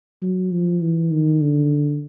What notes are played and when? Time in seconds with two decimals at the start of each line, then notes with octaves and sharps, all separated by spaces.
0.22 F#3
0.52 F3
0.81 E3
1.12 D#3
1.41 D3